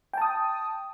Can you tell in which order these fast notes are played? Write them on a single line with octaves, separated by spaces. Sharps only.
G5 A5 D#6